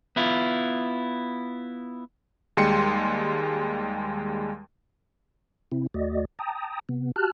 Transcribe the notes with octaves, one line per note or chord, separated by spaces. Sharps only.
B3 E4 F4
D#2 G3 G#3 G5 C6 C#7
C3 C4 E4
D#2 A3 F#4 D5 D#5
G5 A5 A#5 D#6
C3 B3
F#4 G4 A5 F6 F#6